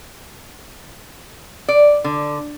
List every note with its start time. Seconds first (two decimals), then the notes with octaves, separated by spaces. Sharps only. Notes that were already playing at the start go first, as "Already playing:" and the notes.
1.68 D5
2.04 D3